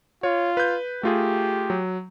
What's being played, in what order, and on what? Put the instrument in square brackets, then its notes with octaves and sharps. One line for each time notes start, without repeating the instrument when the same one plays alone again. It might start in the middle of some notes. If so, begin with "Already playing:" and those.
[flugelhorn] F4 [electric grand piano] C#5
[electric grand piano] B4 G6
[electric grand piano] A3 F4 G#4 [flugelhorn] G4
[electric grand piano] F#3